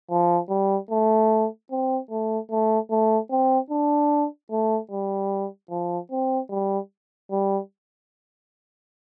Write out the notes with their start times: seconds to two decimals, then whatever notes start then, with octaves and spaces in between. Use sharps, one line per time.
0.11 F3
0.50 G3
0.91 A3
1.71 C4
2.11 A3
2.51 A3
2.90 A3
3.31 C4
3.71 D4
4.51 A3
4.92 G3
5.71 F3
6.12 C4
6.51 G3
7.31 G3